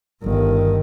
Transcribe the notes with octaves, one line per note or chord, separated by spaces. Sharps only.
G1 D#3